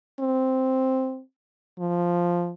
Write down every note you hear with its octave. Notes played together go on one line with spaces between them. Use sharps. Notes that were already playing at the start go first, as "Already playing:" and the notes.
C4
F3